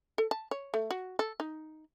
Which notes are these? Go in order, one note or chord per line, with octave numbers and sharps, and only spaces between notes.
A4
A5
C#5
A3
F#4
A4
D#4